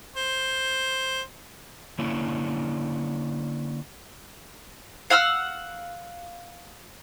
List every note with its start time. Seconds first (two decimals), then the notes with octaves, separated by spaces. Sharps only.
0.16 C5
1.98 D3 A#3 C#4 D4 E4
5.10 F5 F#5 E6 F6